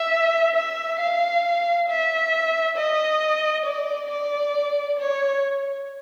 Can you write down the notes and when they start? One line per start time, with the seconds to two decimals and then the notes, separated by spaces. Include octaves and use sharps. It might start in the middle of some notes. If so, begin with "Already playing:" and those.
Already playing: E5
0.56 E5
1.00 F5
1.89 E5
2.77 D#5
3.65 D5
4.10 D5
4.99 C#5